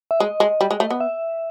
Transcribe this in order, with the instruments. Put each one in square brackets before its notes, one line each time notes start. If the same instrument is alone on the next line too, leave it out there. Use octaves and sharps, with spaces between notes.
[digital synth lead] E5
[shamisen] G#3 [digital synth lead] D#5
[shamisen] G#3
G3
G#3
A3
B3
[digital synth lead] E5